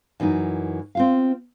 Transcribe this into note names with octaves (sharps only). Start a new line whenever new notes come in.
F#2 E3 F#3 D#4
C4 F4 F5